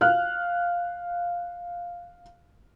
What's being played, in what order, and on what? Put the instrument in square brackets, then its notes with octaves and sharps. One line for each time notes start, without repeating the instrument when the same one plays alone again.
[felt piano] F5 F6 F#6